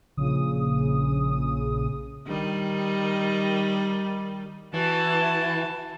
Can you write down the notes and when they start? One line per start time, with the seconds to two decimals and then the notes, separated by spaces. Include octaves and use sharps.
0.17 A#1 C#3 D#6
2.27 D#3 G3
4.74 E3 F#4 A5